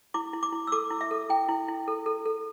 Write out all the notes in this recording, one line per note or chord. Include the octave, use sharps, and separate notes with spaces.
E4 D6
E4
D6
E4
E6
A4 D6
E4
E5
A4
E4 G5
E4
E4
A4
A4
A4